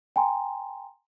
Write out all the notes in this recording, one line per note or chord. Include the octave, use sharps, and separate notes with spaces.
G5 G#5 A#5 C6